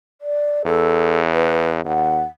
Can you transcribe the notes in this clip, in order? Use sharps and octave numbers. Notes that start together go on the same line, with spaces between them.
D5
E2 A4
B4
D#2 F#5